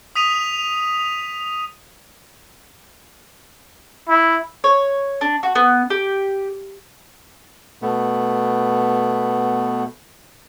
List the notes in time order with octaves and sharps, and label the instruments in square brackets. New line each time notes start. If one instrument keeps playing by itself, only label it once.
[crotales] D#6 B6 D#7 F7
[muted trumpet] E4
[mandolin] C#5
D4
F#4
B3
G4
[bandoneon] B2 A3 B3